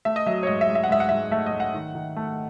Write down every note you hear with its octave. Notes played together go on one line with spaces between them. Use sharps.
A3 E5
D#5
F#3 E5
C#5
G#2 D#5
E5
G#2
E5
F#5
G#2 E5
F#5
G#2 E5
A3 E5
D#5
A3
F#5
D#3
D#3
A3